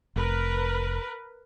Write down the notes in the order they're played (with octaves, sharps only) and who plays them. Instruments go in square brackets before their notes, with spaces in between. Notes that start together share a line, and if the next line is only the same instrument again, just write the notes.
[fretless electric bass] F1 [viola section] A#4 B4